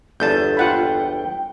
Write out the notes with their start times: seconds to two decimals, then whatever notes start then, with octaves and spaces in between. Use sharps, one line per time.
0.20 G1 E2 A4 D5 A5 G6
0.57 F4 F#5 G5 B5